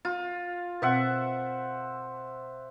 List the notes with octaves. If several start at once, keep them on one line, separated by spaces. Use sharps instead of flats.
F4
B2 C4 C5 E5 F#5